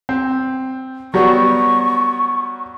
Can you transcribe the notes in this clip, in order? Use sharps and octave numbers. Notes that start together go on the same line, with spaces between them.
C4
F#3 G3 B3 C#6